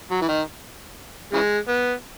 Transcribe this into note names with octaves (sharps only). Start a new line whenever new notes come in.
F#3
E3
D#3
C#3 E3 G#3
B3